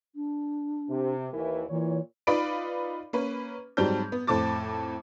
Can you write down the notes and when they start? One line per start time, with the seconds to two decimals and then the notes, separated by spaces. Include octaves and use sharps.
0.15 D4
0.89 C3
1.33 D#2 E3 A#4
1.70 A#2 E3 C#5
2.27 D#4 F4 B4 D5 B5 D7
3.13 A#3 C#4 B4
3.77 G#2 F#3 G3 C4 A5 G6
4.12 B3
4.27 F2 A2 C5 A5 D6 A6